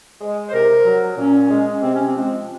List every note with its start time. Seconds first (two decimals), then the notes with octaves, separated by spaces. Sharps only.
0.21 G#3
0.48 C5
0.53 C3 A#4
0.84 F#3
1.17 A#2 C#4
1.49 G#3
1.81 C3 C4
1.93 C#4
2.05 C4
2.13 F3 G#3